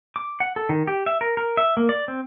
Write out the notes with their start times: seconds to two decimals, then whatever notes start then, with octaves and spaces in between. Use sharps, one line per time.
0.16 D6
0.40 F#5
0.56 A4
0.69 D#3
0.87 G4
1.06 E5
1.21 A#4
1.37 A#4
1.57 E5
1.77 A#3
1.89 D5
2.08 C4